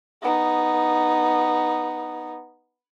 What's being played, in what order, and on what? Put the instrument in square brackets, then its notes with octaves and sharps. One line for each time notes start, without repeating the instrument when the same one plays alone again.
[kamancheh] B3 D#4